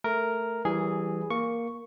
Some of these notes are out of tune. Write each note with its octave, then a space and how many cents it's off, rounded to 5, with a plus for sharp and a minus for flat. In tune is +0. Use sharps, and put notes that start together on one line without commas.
A3 +5 A#4 +0
E3 +0 G3 -20 G#4 +0
A#3 +0 A#4 +0 C#6 +0